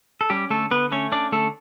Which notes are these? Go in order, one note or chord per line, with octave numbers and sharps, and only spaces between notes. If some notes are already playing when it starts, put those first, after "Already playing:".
A4
G3 C#4 G4
D3 A3 A4
D3 B3 B4
A3 C#4 C#5
C#4 D4 D5
D3 A3 A4